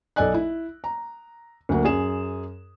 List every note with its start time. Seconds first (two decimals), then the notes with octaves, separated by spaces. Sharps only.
0.16 B1 A4 D5 D#5 G#5 F#6
0.34 E4
0.84 A#5
1.69 D2 F#3 A#3 F#5
1.84 F#2 G#4 E7